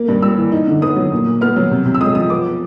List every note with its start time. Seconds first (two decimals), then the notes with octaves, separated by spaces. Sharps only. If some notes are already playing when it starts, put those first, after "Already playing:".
Already playing: A#3
0.08 G2
0.22 G3 E6
0.38 E3
0.52 D#4
0.67 D3
0.82 B3 D#6
0.96 F#3
1.12 A#2
1.26 A#2
1.41 B3 F6
1.56 F#3
1.71 C3
1.85 C3
1.95 E6
2.00 G#3 D#6
2.15 F3 D#6
2.30 B3 D6